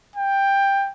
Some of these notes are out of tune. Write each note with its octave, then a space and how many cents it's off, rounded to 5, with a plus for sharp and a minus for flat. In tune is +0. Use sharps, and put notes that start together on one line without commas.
G5 +10